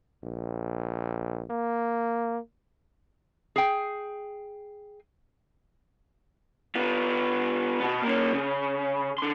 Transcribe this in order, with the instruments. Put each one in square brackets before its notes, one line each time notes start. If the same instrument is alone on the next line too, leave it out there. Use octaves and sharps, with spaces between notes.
[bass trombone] A#1
A#3
[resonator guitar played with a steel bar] G#4 G5
[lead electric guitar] B3 F4
B2 B3
A#3 C#4
C#3
D3 C6